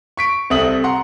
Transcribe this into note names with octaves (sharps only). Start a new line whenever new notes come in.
C#6 B6 D7
C2 C4 A4 E5 D#6 F#7
F#5 A#5 C6